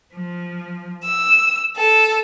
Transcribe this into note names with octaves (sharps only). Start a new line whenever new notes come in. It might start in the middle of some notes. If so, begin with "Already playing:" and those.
F3
E6
A4